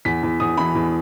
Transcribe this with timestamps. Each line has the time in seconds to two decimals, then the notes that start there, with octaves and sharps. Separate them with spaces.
0.05 E2 B6
0.23 E2
0.40 E2 D#6
0.57 E3 B5
0.75 E2